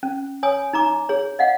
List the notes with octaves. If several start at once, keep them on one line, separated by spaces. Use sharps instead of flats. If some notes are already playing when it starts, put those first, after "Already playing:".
C#4
C#5 G#5 D#6
D#4 A#5 D6
G#4 C#5
D#5 F5 F#5